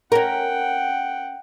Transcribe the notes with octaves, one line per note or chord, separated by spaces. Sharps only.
C#4 A#4 F#5 G5